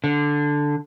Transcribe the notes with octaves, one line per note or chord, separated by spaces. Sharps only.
D3